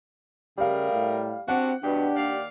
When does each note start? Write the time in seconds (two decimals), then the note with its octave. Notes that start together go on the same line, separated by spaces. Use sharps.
0.58 C#3 G3 A3 G4 G#4 A#4 F5
0.92 A2
1.48 C4 D4 F#4 G4 F#5
1.84 E2 G2 B2 D4 G4
2.16 D#2 D5 F5